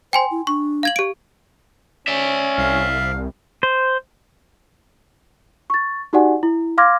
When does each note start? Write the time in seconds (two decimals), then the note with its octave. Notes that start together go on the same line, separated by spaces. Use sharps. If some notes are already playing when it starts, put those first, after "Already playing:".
0.13 C5 G5 G#5 C6
0.31 E4
0.47 D4 C#6
0.83 F5 G#6 F#7
0.96 G4 D7
2.08 C#4 D5 E5
2.58 C2 F5
3.63 C5
5.70 C#6 A6
6.13 D#4 F#4 G4 D5 F#5 G#5
6.43 E4
6.78 F5 C6 D6 F6 G#6 A#6